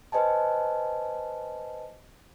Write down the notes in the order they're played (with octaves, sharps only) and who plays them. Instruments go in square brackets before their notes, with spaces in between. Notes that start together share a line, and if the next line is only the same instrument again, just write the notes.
[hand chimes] B4 C5 D#5 G#5 A5